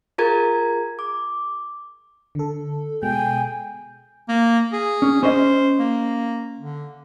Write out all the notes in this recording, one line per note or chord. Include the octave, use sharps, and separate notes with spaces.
F4 G#4 A#4 A#5 G#6
D6
D3 A4
B2 G#3 G5 G#5
A#3
G#4
C#4
C#4 C5 D#5
A#3
D3